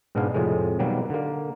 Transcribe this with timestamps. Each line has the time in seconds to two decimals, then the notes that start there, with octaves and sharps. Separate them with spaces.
0.15 G#2 B2 G#3 B3 D4 F5
0.34 F2 A2 C3 G#3
0.79 B2 D#3 F#3 G3 A#3
1.10 D3 A#3